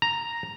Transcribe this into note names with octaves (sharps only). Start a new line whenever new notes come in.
A#5